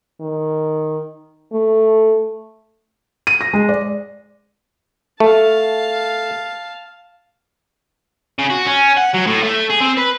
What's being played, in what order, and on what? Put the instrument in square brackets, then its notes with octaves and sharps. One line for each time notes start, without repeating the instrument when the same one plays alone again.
[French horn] D#3
A3
[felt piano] D#7
A#6
G#3
D5
[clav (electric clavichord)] A3 [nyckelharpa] F5 A5
[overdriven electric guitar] C#3
F#4
C#4
F#5
F#3
A2
A3
G#4
C4
B4